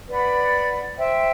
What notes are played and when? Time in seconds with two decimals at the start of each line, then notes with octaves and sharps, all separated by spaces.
0.09 B4 D5 F#5 B5
0.97 C5 E5 G5